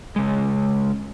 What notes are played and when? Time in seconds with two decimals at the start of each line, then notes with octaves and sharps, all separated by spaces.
0.16 C#3 G#3